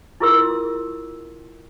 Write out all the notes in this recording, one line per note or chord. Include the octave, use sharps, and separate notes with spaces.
E4 F4 G#4 A#4 C6 E6